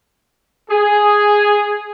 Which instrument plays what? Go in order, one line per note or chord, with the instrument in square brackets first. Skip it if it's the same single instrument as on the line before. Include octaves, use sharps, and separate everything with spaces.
[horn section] G#4